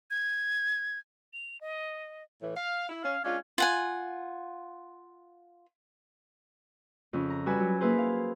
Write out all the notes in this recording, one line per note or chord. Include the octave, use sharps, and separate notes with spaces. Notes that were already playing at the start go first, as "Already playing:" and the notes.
G#6
F7
D#5
A2 E3
F5
E4
C#4 F5
G#3 C#4 D4 F4
F4 F#5 G#5
F2 C#3 C#4
A#5
G3 F#4 B4 G#5 E6
F#3
A#3 E4 G#4 B4 C5
F5